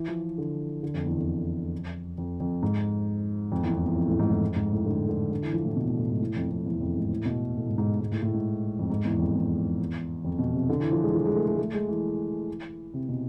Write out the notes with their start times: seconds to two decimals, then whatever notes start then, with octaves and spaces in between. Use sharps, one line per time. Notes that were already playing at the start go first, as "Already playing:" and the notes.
Already playing: E3
0.08 F3
0.23 E3
0.38 D3
0.83 D3
0.94 F2
1.05 E2
1.17 F2
2.18 F2
2.40 F2
2.62 G#2
3.52 F2
3.63 E2
3.74 E2
3.86 E2
3.96 F2
4.08 A2
4.19 G#2
4.31 A2
4.41 F2
4.56 G#2
4.72 A2
4.86 D3
5.09 D3
5.31 D3
5.42 E3
5.53 F3
5.65 A2
5.76 B2
5.87 B2
5.98 A2
6.10 G#2
6.20 A2
6.36 F2
6.51 F2
6.66 E2
6.81 F2
6.96 G#2
7.10 A2
7.25 B2
7.56 A2
7.66 G#2
7.78 G#2
8.00 G#2
8.12 A2
8.22 A2
8.34 G#2
8.79 F2
8.90 G#2
9.05 E2
9.19 F2
9.34 E2
10.24 F2
10.39 B2
10.54 C3
10.69 D3
10.80 E3
10.92 F3
11.03 G#3
11.14 F3
11.26 G#3
11.36 A3
11.47 A3
11.59 A3
11.74 G#3
11.88 E3
12.94 C3
13.09 B2